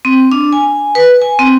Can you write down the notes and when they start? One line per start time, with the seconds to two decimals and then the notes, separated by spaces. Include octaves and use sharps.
0.05 C4
0.32 D4
0.53 G#5
0.95 B4
1.22 G#5
1.39 C4